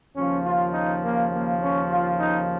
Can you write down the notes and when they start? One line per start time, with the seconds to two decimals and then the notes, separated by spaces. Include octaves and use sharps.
0.15 D#2 C#3 F3 C#4
0.44 F4
0.73 D#4
1.02 A#3
1.31 A#3
1.60 C#4
1.89 F4
2.17 D#4